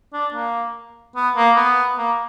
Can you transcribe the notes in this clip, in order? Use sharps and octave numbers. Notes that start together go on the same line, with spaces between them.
D4
A#3
B3
A#3
B3
A#3